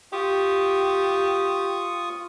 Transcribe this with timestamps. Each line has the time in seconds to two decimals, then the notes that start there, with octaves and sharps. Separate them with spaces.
0.13 F4 G4 C#6 D#6